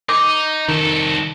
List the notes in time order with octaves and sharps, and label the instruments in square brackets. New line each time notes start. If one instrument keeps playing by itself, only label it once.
[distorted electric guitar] D#4 [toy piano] D6
[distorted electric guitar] C2 A4 [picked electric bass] D#3